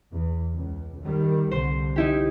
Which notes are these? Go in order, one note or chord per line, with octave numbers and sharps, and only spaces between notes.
E2
C#2
D#3 G3
C2 D3 C5
D#4 E4 G4